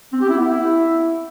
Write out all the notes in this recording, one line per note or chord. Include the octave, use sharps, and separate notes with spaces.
C4
G4
E4
B3
E4